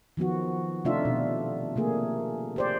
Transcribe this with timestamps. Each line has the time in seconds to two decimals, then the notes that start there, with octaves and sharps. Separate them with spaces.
0.17 D#3 F3 B3 F#4
0.85 C3 A3 D4 D#4 F4 E5
1.05 B2
1.76 C3 A3 A#3 G#4
2.56 G4 C5 D5